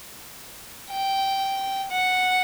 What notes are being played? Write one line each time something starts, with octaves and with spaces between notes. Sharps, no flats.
G5
F#5